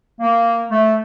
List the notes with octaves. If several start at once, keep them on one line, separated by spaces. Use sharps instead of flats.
A#3
A3